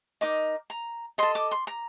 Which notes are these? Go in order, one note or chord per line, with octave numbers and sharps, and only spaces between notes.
D#4 A#4 D#5 D6
A#5
A4 D#5 C6
D6
C6
A#5